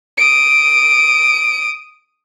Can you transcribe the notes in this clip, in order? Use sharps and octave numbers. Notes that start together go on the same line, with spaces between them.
D#6 D7